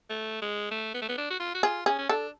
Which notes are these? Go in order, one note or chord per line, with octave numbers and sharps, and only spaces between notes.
A3
G#3
A3
B3
A3
B3
D4
F#4
F4
F#4
F4 G#4
C#4 G#4
C#4
D4 A4